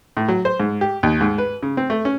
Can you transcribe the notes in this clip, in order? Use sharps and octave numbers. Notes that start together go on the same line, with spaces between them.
A2
F#3
C5
G#2
G4
D#2
G#2
B4
C#3
C4
A3
C#4